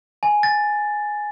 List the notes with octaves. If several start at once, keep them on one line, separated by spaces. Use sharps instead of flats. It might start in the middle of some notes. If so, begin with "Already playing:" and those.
G#5
A6